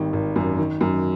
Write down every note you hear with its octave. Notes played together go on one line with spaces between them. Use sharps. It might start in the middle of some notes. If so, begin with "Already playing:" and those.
Already playing: G#1 D#3 G3
G#1
F#2
D#3
F#2